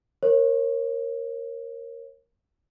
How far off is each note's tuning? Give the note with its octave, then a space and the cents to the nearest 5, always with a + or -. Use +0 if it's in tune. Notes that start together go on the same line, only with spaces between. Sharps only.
A#4 +0 C#5 -30